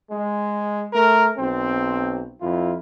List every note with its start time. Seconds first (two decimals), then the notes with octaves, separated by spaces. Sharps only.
0.11 G#3
0.93 A3 A#4
1.38 B1 C4
2.41 F2 E4 F4